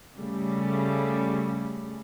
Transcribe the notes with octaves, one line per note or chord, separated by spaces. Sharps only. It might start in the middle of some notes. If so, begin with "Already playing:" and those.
C#3 G3 A3